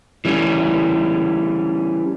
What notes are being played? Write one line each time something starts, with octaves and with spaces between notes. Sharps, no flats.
E3 G3 C#4